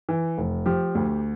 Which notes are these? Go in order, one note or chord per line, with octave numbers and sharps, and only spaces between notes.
E3
F1
F3 G4
D2